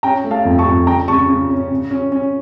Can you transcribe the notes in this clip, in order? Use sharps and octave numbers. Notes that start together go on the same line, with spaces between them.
C#4 G5 A#5
A3
F5 A5
F2
A5 C#6
F2
C#3 G5 A#5
C#3 A5 C#6
C#3
C#4
C#3
C#4
C#4